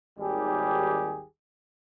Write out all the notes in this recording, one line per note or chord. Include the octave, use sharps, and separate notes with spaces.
G#1 D#2 D#3 G3 G4 G#4